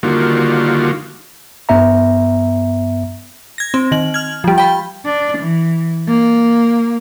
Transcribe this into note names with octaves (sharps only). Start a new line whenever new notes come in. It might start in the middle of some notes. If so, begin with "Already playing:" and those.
D3 D#3 G3 A#3 F4 F#4
G2 B3 E5 A#5
G#6 A#6
C4
D#3 F#7
F6 G#6
F3 G3
G5 B5
D4
E3
A#3